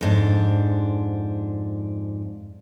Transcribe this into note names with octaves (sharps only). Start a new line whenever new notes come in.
F2 G#2 D4